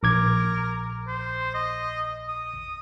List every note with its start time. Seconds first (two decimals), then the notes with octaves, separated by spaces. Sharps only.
0.03 A#1 A#4 D6 G#6
1.08 C5
1.54 D#5
2.29 D#6